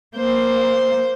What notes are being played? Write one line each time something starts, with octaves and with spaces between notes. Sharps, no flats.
A#3 C5